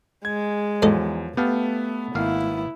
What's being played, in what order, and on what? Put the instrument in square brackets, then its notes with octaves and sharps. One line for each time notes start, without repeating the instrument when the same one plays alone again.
[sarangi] G#3 [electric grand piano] G#6
[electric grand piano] E2 [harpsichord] G#2 A4 D#5 [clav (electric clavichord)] F3 F#3
[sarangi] A3 [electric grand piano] B3 [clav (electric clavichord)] G4 F5 A5
[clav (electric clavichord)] G#1 A#3 F5 [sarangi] E4